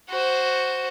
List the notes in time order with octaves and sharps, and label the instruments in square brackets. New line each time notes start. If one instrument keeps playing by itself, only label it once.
[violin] F#4 C5